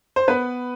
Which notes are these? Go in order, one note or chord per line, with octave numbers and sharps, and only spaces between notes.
C5
B3 B4